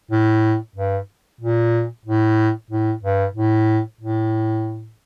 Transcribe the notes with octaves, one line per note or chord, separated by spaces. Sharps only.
A2
G2
A#2
A2
A2
G2
A2
A2